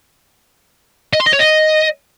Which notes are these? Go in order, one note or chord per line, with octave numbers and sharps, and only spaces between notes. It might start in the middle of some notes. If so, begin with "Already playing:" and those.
D#5
C6
D#5
C#5
D#5